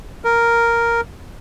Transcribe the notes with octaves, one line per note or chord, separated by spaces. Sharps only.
A#4